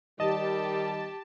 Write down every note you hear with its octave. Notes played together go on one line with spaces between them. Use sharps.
D#3 G3 G4 D#5 A5